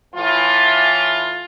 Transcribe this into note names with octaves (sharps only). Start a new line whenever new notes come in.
A2 E3 F4